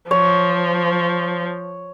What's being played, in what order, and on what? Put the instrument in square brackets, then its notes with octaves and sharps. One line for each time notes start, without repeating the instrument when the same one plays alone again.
[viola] F3 [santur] C#5